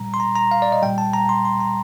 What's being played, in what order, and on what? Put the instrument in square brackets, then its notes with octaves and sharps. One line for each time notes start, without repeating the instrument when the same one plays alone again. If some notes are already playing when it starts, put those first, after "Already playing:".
Already playing: [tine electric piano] A#2 G3 A#5
C6
A#5
A#5
F5
D5
D#5
A#2 G3 G5
A5
A#5
C6
C6
A#5